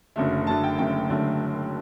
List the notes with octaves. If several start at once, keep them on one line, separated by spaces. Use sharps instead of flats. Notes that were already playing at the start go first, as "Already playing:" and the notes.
F#1 F#2 D3 A3
F#1 F#2 D3 A3 A5
G5
F#1 F#2 D3 A3 G5
F#1 F#2 D3 A3